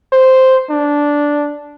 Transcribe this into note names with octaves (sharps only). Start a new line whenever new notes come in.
C5
D4